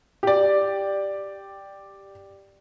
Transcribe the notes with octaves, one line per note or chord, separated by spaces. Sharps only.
G4 D5